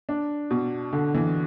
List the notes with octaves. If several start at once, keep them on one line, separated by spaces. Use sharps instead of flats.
D4
B2
D3
E3